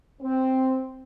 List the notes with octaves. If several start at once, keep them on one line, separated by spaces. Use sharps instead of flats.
C4